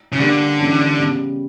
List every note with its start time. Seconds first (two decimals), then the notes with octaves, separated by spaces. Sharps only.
0.12 C#3
0.19 D3 G3 A#3 D4 G4
0.58 E3 G3 A#3 C#4
0.97 C#3 G3 B3